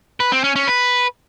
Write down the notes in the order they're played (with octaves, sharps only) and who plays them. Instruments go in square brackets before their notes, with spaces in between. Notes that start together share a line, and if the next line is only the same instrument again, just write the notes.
[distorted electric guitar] B4
C4
C#4
C#4
B4